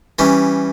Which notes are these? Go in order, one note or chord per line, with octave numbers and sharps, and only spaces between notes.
E3 G3 C#4